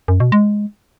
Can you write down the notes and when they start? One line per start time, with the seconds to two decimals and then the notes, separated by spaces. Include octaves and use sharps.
0.08 F#2
0.20 B2
0.32 G#3